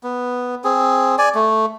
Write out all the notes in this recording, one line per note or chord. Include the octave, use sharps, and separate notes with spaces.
B3
C4 G#4
D5 G#5
A3